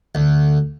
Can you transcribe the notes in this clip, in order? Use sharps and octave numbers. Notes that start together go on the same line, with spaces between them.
D2